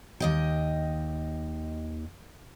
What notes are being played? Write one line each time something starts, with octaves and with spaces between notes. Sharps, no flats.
D#2 D#5 G5